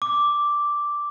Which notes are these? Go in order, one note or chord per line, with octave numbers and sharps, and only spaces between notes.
D6